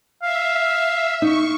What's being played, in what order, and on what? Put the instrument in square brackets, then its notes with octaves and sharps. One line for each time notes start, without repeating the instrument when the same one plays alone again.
[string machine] E5 [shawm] F5
[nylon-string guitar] D#4 [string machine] C#6